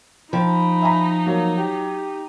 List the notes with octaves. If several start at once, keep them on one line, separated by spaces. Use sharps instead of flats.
F3 D#4 G5 B5
E5 G#5 A#5
F#3 A#3
G4